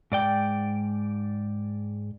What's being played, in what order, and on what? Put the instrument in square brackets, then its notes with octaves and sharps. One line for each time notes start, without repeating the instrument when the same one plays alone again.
[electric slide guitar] G#2 D5 G5